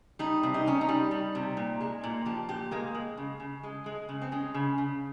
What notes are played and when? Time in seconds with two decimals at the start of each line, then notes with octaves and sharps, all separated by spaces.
0.19 G3 D#4
0.43 C3
0.54 D#4
0.66 C3 C#4
0.81 D#4
0.89 G3
1.11 G3
1.35 C3
1.57 A#2
1.81 G#3
2.04 A#2
2.25 F3 G4
2.49 A#2 G4
2.71 G#3 A#3
2.95 G#3
3.17 C#3
3.40 C#3
3.63 G#3
3.86 G#3
4.09 C#3
4.22 C4
4.32 G#3 C#4
4.54 C#3
4.78 C#3